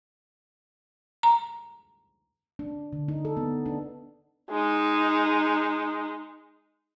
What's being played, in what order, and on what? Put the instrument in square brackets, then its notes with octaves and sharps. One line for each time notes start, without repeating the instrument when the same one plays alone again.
[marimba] A#5
[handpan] D4
D3
D#4
A4
B3
D4
[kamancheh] G#3 D#4